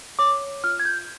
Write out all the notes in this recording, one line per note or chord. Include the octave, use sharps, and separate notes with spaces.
C#5 D6
F4 F6
G#6
G6